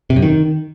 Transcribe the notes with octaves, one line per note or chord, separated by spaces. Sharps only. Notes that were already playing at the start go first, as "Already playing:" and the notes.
C3
F#2
D#3